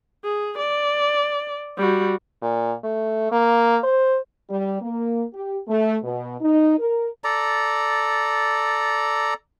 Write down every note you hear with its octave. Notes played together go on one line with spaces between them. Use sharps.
G#4
D5
G3 F#4
A#2
A3
A#3
C5
G3
A#3
G4
A3
B2
D#4
A#4
A4 D5 A#5